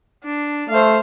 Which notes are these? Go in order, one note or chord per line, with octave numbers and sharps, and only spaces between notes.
D4
A3 C5 F5